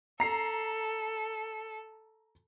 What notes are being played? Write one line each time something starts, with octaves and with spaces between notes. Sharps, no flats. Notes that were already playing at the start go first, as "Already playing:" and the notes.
A4 A#5 C7